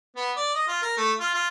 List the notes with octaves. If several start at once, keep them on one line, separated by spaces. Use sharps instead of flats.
B3
D5
D#5
F4
A#4
A3
F4
F4